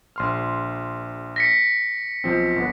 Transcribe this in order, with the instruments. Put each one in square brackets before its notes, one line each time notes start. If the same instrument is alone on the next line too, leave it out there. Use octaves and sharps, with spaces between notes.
[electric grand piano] A#1 C6 F6
[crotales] A#6 B6 C#7
[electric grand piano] B1 F3 C4
G1 B3 F#5